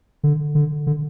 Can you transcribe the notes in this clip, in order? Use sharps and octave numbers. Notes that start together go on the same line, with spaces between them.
D3
D3
D3